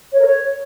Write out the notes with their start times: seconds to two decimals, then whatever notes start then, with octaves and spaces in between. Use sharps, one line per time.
0.13 C#5
0.19 A#4
0.25 C#5